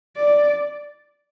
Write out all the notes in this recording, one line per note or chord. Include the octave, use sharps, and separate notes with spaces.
D5